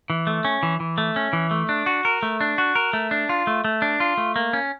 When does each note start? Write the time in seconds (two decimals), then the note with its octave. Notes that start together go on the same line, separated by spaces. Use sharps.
0.10 E3
0.27 A3
0.45 C#4
0.63 E3
0.80 E3
0.98 A3
1.16 C#4
1.33 E3
1.51 A3
1.69 D4
1.86 F#4
2.05 A#4
2.23 A3
2.41 D4
2.58 F#4
2.75 A#4
2.93 A3
3.11 D4
3.29 F4
3.47 A3
3.65 A3
3.82 D4
4.00 F4
4.17 A3
4.36 A#3
4.53 C#4